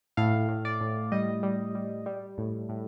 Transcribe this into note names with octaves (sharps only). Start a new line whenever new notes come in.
A2 F5
A2
D5
A2
G3 D#5
G3
G3
G3
A2
A2